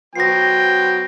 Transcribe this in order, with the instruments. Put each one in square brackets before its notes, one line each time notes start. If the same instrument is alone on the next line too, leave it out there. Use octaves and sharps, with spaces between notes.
[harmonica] F#3 B3 C5 [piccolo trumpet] G5 [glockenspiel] A#6 C7